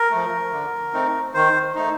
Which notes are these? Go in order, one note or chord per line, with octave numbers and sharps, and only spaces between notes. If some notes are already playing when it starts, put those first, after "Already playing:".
Already playing: A#4
F3 A3
D3
A3 C4 D#4
D#3 C5
A3 D#4